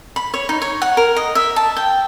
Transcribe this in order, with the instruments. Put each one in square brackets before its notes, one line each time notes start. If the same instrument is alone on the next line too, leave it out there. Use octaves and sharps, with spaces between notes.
[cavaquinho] B5
C#5
D#4
C#5
F#5
A#4
D#5
E5
A5
G5